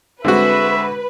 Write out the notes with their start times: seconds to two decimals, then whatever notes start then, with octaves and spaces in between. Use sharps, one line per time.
0.25 D3 G#3 C4 F#4 B4 E5